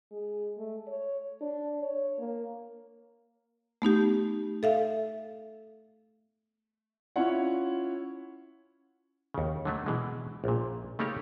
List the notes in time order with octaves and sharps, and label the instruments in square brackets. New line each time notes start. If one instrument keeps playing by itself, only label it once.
[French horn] G#3
A3
C#5
D4
C#5
A#3
[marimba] A3 B3 D#4 G4
A4 E5 F5
[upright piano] C#4 E4 F4 C#5 F#5
[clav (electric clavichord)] D#2 C#3
D3 F#3 A3
B2 E3 G#3
A#1 A#2
C#3 A3 A#3 D#4 G4 C#5